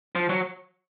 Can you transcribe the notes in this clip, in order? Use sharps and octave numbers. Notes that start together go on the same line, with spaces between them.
F3
F#3